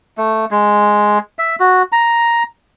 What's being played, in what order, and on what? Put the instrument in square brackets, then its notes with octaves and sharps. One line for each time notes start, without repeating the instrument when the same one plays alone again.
[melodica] A3
G#3
E5
F#4
A#5